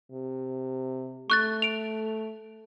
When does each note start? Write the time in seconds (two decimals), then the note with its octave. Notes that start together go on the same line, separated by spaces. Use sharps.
0.12 C3
1.30 A3 C#6 F#6 A6
1.62 D7 F7